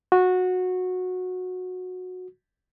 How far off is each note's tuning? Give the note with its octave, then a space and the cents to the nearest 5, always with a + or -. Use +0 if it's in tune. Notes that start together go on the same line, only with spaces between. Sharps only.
F#4 -15